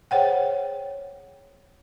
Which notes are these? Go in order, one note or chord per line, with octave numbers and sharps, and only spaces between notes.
G#4 C5 C#5 F#5 G5